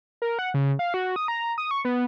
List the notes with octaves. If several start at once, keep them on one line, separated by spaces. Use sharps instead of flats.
A#4
F#5
C#3
F5
F#4
D#6
A#5
D#6
C#6
B3